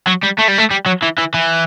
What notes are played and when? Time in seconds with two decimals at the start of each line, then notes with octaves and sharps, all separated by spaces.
0.07 F#3
0.23 G3
0.38 A3
0.48 G3
0.58 A3
0.71 G3
0.86 F#3
1.03 E3
1.18 E3
1.34 E3